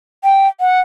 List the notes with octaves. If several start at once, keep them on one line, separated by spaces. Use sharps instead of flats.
G5
F#5